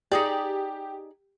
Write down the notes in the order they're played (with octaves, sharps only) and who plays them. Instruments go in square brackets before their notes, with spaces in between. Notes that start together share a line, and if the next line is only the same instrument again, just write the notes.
[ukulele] D#4 G#4 D5 [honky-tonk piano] G4